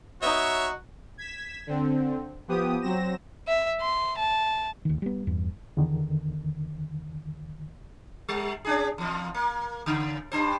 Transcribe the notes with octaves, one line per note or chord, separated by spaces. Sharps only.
B3 D#4 F#4 C#5 E5
G#6 B6 E7
D3 C4
F3 B3 G4 D#6
F#3 C4 A#6 E7
E5
C6
A5
D2 D#3
G3 B3
E2 G2
E2 D3 D#3
G3
C#4 D4 G#4
E2 F3
A#3
C#3
G2 D4 C5